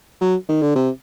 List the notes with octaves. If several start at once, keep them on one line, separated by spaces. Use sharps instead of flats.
F#3
D#3
D3
C3